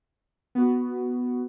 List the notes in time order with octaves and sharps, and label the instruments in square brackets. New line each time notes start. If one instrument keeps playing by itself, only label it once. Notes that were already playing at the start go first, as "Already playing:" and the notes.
[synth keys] B3 F#4